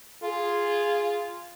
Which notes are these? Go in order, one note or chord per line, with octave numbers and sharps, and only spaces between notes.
F4 G#4